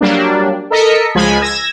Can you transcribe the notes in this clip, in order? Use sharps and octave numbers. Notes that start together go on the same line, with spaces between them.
F#3 G3 A#3 D4
A4 A#4 D#5 B6 C#7
C#2 F3 G#3 G#5 B5
E6 G#6 A#6